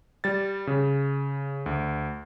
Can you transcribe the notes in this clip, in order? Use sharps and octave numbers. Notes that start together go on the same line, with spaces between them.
G3 A6
C#3
D2